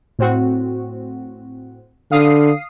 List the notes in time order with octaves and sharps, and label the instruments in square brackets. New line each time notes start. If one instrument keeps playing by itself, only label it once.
[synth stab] A2 C4 F#4
[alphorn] D3 [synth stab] F5 D#6 C7